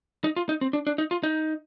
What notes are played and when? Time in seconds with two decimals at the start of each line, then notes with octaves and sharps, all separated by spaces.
0.24 D#4
0.36 F4
0.49 D#4
0.61 C4
0.73 D4
0.87 D4
0.98 D#4
1.11 F4
1.23 D#4